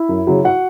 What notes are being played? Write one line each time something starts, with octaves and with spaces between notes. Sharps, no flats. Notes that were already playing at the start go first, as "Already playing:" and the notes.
Already playing: E4 E5
F#2
C#3 F#3
F#4 F#5